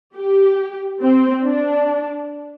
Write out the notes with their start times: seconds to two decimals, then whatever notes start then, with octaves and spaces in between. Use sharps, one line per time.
0.17 G4
1.03 C4
1.45 D4